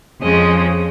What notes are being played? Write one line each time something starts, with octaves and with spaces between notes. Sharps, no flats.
F2 C#3 G#3 D#5